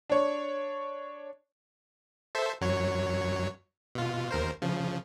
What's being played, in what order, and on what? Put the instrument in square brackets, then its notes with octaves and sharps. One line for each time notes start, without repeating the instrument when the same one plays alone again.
[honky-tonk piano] D4 C#5
[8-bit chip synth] A4 C5 E5
F#2 F#3 C#5
B2 F4
D#2 A#4 C5
C#3 F3